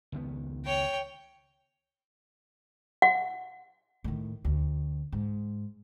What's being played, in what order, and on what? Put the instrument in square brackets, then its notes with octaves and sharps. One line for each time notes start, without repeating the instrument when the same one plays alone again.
[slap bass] C#2 D#3 B3
[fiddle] C#5 G5
[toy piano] F#5
[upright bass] A2 D#3
D2
G#2